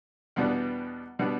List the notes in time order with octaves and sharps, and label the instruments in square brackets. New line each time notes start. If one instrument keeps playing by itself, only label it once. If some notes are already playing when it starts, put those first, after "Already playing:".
[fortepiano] E2 B2 G3 B3 D4
B2 G3 B3 D4